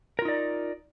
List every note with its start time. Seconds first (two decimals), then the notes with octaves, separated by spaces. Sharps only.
0.19 A#4
0.22 F4
0.25 D#4
0.28 D5